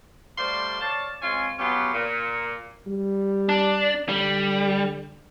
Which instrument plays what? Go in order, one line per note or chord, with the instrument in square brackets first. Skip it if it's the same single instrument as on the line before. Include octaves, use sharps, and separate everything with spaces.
[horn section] G3 A3 F4 C5 D5 C6
C#5 D5 F5 A5
G#3 C4 C#4 F4 G#5
F#3 B3 C#4 F4 G4
A#2
[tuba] G3
[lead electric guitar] D4
[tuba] D3 [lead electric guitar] G3